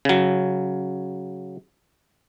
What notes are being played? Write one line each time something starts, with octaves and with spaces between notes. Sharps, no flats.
C#3 F#3